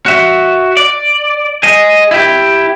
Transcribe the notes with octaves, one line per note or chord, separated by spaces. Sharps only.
F#4 E5
D5
G#4 D#5
E4 G4